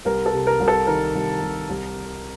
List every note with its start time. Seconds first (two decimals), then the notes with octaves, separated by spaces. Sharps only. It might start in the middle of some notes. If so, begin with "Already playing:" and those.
0.05 C2 A#4
0.26 A4
0.32 C3
0.47 A#4
0.60 C2
0.68 A4
0.87 D#3 A#4
1.15 C2
1.41 C2
1.69 C2